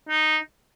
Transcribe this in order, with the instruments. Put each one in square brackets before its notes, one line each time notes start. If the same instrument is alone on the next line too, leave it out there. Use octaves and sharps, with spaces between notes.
[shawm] D#4